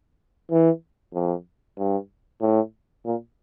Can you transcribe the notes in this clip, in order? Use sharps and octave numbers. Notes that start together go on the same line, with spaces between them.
E3
F2
G2
A2
A#2